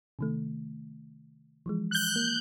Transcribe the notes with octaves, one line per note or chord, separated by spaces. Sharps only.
C3 D#3 A3
E3 F3 G#3
F#6 G6
A#3